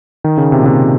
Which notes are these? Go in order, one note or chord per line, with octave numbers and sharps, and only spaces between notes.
D#3
C#3
C3
A#2
C3